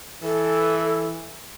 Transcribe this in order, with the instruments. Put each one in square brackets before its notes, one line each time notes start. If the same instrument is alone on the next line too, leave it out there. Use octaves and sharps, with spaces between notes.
[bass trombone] E3 [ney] A4